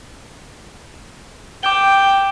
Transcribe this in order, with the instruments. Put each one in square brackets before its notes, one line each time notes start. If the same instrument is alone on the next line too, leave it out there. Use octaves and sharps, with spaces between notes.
[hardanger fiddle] G5 [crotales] D6 G6 G7